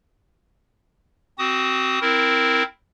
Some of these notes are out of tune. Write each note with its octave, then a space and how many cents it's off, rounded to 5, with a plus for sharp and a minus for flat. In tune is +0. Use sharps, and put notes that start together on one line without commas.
C4 +0 F#4 +30 D#6 +0
C4 +0 E4 +0 A#4 +0